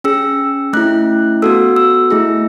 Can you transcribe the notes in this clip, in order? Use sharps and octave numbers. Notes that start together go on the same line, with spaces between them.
C#4 G#4 E6
A3 C#4 E4 F#6
B3 F#4 A4 E6
E6
A3 E4 G#4